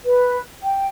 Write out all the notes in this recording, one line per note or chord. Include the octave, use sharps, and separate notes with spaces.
B4
G5